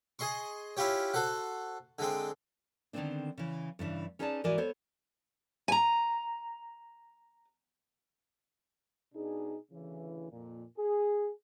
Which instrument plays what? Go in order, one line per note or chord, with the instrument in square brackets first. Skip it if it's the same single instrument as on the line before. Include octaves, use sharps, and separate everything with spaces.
[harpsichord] G#4 D#5 C6 C#6
C#4 E4 F4 G4 C#5
F#4 A4 C5 F#5
D3 G#3 C4
[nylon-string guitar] D3 D#3 G3 B3 C4 D4
C#3 E3
G2 C#3 E3 D4
C#4 D#4 G#4 B4 D5 A5
G#2 E3 F#4 A#4 D5 G#5
B3 A4 C5 C#5
[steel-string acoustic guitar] G#5 A#5
[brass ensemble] B2 D4 D#4 G#4
D2 C#3 E3
F2 A#2
G#4